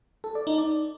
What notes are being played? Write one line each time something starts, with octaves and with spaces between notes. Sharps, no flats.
A4
D5
D#4
D5